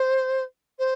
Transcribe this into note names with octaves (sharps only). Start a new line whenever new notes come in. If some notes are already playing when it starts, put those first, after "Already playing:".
Already playing: C5
C5